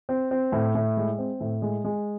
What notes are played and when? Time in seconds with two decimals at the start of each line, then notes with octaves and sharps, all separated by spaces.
0.09 C4
0.31 C4
0.52 A2
0.75 A2
0.97 G#3
1.18 C4
1.40 A2
1.62 G#3
1.84 G#3